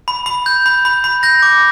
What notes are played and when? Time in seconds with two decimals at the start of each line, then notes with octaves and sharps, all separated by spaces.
0.08 B5
0.26 B5
0.46 G6
0.66 B5
0.85 B5
1.04 B5
1.23 G6 A#6
1.42 D6